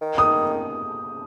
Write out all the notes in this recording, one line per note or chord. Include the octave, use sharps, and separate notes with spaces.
D#3
D#6